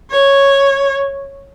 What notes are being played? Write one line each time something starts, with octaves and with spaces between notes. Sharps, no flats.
C#5